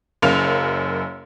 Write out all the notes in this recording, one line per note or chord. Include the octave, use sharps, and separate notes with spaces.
F#1 F#2 F5 F7